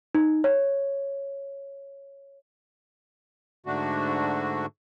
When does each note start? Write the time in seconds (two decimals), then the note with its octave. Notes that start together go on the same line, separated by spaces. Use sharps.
0.15 D#4
0.44 C#5
3.66 G#2 D3 A3 D4 F#4